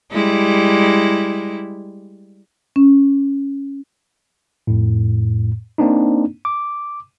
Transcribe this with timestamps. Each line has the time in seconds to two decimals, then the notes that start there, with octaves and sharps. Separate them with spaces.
0.12 G3 G#3 E4
2.76 C#4
4.67 F2 A2
5.78 A#3 C4 D4 D#4
6.45 D6